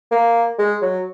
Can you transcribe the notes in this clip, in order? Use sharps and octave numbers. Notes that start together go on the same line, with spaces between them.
A#3
G#3
F#3